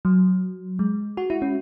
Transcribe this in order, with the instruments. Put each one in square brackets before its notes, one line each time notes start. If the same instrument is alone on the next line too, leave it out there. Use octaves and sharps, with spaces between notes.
[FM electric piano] F#3
G#3
F#4
E4
C#4